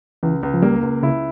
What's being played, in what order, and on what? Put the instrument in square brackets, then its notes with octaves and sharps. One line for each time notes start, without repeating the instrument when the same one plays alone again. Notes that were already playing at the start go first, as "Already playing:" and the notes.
[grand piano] C#2 [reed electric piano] E3
[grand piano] C#2
[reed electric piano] F3
[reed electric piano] G3 [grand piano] A#3
[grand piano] C#2
[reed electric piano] C#3 [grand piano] E4